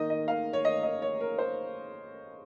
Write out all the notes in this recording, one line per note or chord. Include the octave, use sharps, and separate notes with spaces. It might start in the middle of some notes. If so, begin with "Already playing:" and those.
Already playing: D#3 A#3 D#4 D#5
D#5
F5
C#5
D#5
D#5
C#5
A#4
C5